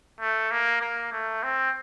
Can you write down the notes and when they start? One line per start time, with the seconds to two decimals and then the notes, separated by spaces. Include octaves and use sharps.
0.21 A3
0.51 A#3
0.81 A#3
1.12 A3
1.43 C4